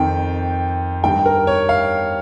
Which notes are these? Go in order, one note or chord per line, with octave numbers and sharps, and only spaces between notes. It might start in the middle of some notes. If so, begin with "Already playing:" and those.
Already playing: F2 D#3 G5
G2 D#3 G5
A#4
C#5
F5